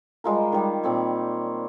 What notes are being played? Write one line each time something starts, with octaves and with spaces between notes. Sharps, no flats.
G3 G#3 F4 A#4
D#3 G3
A#2 C4 C#5